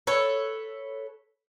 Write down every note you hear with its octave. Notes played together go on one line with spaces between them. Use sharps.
A4 B4 C#5